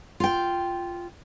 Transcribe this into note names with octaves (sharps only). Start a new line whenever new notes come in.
F4 G5